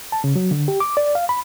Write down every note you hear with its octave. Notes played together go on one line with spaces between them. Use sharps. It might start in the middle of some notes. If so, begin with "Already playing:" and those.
A5
C#3
F#3
D3
G4
D6
D5
F5
B5